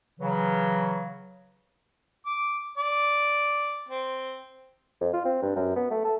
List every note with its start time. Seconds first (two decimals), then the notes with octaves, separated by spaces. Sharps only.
0.20 C#3 E3 F#3
2.26 D6
2.78 D5
3.89 C4
5.01 F2
5.13 F4
5.25 C4
5.43 G2
5.56 F#2
5.76 B3
5.91 A3
6.05 A4